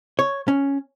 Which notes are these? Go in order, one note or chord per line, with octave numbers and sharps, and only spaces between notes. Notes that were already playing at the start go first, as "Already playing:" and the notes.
C#5
C#4